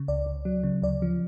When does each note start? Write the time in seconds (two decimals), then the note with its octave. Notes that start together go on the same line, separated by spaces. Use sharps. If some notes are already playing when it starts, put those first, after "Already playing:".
Already playing: C#3
0.08 C#2 D5
0.26 C#2
0.45 F#3
0.63 C#3
0.82 D2 D5
1.02 F3